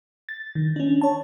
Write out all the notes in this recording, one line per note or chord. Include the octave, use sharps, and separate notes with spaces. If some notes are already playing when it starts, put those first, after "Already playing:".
A6
D#3
C#4 D4
C#5 A5